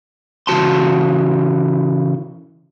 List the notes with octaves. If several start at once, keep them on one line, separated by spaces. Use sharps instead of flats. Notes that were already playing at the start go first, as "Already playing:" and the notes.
C#3 E3 D#4 F#4 A5 C6